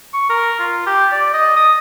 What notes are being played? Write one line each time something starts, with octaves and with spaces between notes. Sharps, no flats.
C#6
A#4
F4
G4
D5
D#5
D#6